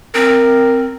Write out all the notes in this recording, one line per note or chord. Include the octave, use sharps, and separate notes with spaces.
C4 A#4